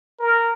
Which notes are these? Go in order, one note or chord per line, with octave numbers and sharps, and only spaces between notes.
A#4